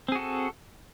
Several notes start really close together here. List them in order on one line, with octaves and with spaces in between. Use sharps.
C4 G#4 F#4 A4